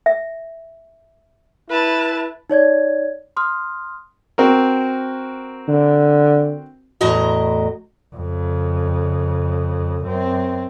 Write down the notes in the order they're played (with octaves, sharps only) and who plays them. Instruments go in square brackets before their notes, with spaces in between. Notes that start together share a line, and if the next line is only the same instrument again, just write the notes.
[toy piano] E5
[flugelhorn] E4 [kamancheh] B4 A5
[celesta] D#4 C#5 D5 G#6
C6 D#6 F6
[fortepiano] C4 F#4 A#4
[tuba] D3
[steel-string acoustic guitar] E2 A2 F#4 D#5 A#5
[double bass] F2 C#3
F#2 C4